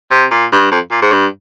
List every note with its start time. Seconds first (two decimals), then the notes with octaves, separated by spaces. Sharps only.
0.11 C3
0.31 A#2
0.52 G2
0.71 F2
0.91 A#2
1.02 G#2
1.12 G2